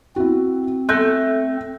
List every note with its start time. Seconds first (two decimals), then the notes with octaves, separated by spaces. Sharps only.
0.16 C4 E4 F#4
0.89 A3 F#6 G6 A#6